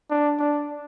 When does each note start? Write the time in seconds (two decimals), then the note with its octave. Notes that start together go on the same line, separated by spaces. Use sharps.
0.10 D4
0.39 D4